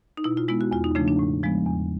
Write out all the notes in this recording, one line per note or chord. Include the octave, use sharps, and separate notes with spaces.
D#4
B2 E4
F4
G#3 B3 E4
F#4
E2 F4
D#4
C#3 F3 A3 D4
D4
A2
F3 G#3 B3
E2